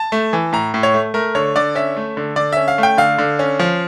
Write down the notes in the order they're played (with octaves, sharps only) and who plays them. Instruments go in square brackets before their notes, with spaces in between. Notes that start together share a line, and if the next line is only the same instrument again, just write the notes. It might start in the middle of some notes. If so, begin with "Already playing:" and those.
Already playing: [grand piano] A5
A3
E3
A2 A#5
A2
C#5
A3
A3 A#4
D3 C#5
D3 D5
C#4 E5
A3
D3
D3 D5
C#4 E5
F5
A3
G5
D3 F5
D3
C#4
F3